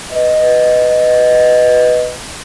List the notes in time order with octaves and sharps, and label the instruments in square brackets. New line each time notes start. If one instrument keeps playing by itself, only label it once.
[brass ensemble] B4 D#5